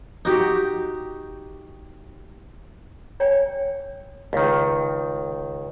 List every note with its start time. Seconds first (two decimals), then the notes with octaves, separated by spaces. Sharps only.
0.25 D#4 F#4 G4
3.20 C#5 D5 G5 G#5
4.33 C#2 D#3